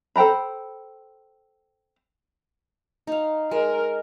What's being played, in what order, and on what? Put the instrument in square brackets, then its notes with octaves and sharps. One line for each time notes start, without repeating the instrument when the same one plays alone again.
[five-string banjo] A4 C5 G5 A#5 B5
[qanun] D#4 F5
[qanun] G#3 [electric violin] A#4